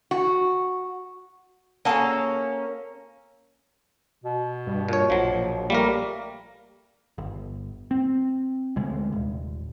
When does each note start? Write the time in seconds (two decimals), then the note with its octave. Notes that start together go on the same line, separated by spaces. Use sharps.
0.11 F#4
1.85 A#3 C#4 F#4 G#4 A4
4.24 B2
4.67 G2
4.88 A#2 C#5
5.10 A#1 B2 F3 F#3
5.70 G3 A3 A#3 A#4
7.18 G1
7.91 C4
8.76 D2 C3 G#3
9.12 D#1